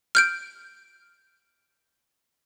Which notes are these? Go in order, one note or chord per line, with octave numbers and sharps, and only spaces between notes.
F6 G6 D7